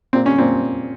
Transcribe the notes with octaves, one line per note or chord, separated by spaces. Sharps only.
A#2 C4
C#4
A#2 C4